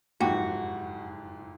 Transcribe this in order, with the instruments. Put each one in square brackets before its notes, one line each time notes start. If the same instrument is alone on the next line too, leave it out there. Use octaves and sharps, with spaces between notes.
[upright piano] F#1 F2 G#2 [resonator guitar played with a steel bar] F#4 [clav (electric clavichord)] G4